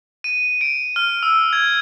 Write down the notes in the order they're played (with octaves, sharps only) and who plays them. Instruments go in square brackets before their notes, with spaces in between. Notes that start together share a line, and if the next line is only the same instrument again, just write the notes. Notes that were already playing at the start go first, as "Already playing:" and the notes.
[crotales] D#7
D7
F6
E6
G#6